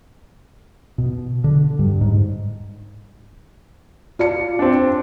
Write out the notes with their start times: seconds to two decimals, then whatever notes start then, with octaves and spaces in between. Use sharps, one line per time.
0.98 B2
1.44 D3
1.79 G2
2.01 G#2
4.19 F4 D5 C#7
4.59 C4 D4